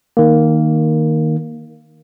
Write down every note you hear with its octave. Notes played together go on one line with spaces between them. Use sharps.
D#3 A#3